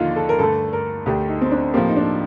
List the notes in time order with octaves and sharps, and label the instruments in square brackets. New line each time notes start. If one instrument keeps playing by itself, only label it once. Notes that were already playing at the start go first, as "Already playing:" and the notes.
Already playing: [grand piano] D#2 D3 F3 [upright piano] D#4 F4
[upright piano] A4
A#4
[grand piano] G2 D3 A3 [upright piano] A4
[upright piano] A#4
[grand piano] D2 D3 A3 [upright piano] G4
[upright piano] D#4
C4
D4
[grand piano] A2 F3 C4 G4 [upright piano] A#3
[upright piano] D#4
D4